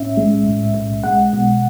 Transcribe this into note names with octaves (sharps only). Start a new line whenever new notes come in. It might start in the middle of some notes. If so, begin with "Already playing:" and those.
Already playing: B1 A2 C#4 E5
G#3
A2
B1
G#3 F#5
B2